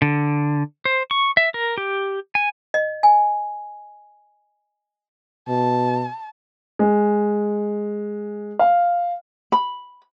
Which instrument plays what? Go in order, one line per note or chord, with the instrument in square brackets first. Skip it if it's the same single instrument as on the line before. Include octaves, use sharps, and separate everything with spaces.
[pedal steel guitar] D3
C5
C#6
E5
A#4
G4
G#5
[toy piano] D#5
G#5
[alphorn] B2 [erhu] A5
[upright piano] G#3
F5
[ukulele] B5